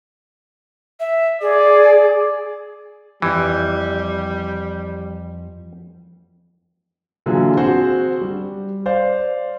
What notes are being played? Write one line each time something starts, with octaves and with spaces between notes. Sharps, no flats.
E5
G#4 D5
F2 E3 F3 G3 E4
A#2 D3 E3 F#3 F4 G#4
C4 F#4 G#4 C5
G3
C5 D5 F5